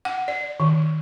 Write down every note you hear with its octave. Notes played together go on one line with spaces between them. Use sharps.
F#5
D5
D#3